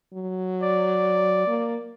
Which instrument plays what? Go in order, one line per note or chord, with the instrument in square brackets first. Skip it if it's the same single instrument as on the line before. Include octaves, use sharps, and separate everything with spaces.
[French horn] F#3
[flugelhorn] D5
[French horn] A#3